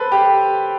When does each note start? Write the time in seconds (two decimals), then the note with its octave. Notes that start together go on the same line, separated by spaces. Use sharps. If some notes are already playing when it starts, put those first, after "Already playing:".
Already playing: A4 B4 C5
0.12 G4